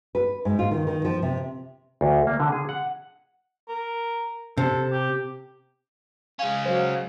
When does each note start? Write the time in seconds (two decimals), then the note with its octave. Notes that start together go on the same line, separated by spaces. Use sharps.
0.15 B4
0.45 G#2
0.59 F4
0.71 D#3
0.87 D#3
1.05 F3
1.22 C3
2.01 D2
2.27 A#3
2.40 D3
2.52 G#4
2.69 F#5
3.68 A#4
4.57 C3 A4
4.92 G4
6.39 G#3 C#4 F5
6.65 F#3 C5